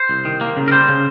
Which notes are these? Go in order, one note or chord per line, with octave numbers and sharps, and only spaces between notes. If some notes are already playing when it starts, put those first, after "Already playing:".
Already playing: C5
C2
D#3
A#3
C#3
A#4
G3 C5
C#3